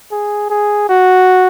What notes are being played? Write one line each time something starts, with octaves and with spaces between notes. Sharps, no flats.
G#4
G#4
F#4